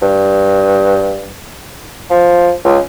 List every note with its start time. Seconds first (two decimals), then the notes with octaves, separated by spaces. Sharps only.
0.02 G2
2.10 F3
2.65 C#2